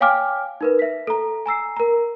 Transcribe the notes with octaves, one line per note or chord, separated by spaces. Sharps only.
C#5 F5 G5 G#5 D6 F6
D#4 A#4 B4
E5 B6
A4 A#5
G#5 A#5 E6 C7
A#4 A#5